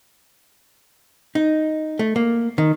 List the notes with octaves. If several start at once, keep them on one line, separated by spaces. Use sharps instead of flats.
D#4
A3
A#3
D#3